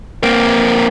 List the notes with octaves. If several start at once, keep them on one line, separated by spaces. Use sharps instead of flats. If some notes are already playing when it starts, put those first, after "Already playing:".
A#3 C4